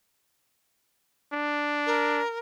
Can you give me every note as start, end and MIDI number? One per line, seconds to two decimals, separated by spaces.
1.33 2.21 62
1.86 2.39 70